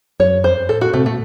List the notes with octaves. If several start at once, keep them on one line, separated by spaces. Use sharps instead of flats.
F#2 C#5
F2 C5
A2 A4
A#2 F#4
C3 A3
A#2 A3